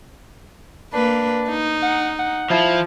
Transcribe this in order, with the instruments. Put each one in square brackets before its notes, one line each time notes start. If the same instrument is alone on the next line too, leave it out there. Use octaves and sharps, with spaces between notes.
[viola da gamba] A#3 B4 [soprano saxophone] D4
[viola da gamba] D#4
[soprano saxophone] F#5
F#5
[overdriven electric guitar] F3 [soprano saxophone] E4